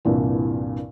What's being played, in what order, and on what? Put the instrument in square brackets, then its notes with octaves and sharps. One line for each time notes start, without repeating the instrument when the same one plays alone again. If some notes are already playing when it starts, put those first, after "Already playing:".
[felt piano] C2 G2 A#2 E3